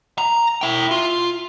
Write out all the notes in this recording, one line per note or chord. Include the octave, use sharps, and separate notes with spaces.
A#5
E4 G5
F4